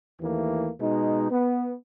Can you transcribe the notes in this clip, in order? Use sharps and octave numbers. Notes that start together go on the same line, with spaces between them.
D#2 E3 A3 A#3
B2 G#3 D#4
B3